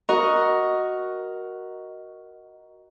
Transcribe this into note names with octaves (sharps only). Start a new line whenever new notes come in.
F#4 A#4 D#5 C#6